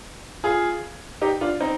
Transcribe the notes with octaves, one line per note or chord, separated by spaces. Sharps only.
F4 G#4
D#4 G4
D4 F4
C4 D#4